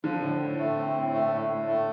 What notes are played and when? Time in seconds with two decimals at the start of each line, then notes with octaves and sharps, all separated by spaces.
0.04 D3 F3
0.22 A2
0.41 A2
0.58 A3
0.76 C4
0.94 A2
1.13 A3
1.31 A2
1.49 A2
1.66 A3